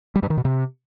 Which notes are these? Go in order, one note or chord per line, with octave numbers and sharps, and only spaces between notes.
G3
G2
D#3
B2
C3